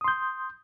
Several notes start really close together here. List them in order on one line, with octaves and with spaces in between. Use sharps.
D#6 C6 G6